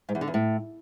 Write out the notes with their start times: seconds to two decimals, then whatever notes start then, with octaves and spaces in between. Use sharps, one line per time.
0.09 G#2
0.15 E2
0.21 D3
0.28 E2
0.34 A2